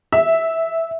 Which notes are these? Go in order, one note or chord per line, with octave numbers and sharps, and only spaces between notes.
E5